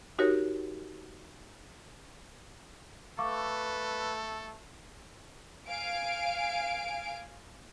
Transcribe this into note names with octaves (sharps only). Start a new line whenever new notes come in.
D#4 F#4 G4 A#4 C#5
A3 A4 B4 F5 C#6 D6
F5 G#5 D7